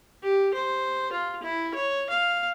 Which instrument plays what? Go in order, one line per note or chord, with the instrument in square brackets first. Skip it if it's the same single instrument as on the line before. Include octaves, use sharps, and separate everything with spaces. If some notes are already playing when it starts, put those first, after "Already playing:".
[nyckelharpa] G4
C5
F4
E4
C#5
F5